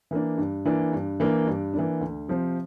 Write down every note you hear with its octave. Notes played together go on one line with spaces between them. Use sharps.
E3 A#3 D4
G2
E3 A#3 D4
G2
E3 A#3 D4
G2
E3 A#3 D4
D2
C3 F3 C4